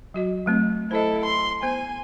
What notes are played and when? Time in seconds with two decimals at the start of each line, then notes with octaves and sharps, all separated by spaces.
0.14 F#3 F#4 D#5
0.46 F#3 A3 C4
0.91 E4 A4 C5 D#5
1.25 C6
1.63 B3 C5 G#5